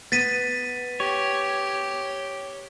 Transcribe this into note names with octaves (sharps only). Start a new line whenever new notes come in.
B3 A6 B6 D#7
G4 C#5